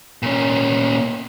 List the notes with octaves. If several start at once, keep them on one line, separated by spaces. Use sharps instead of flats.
A#2 C#4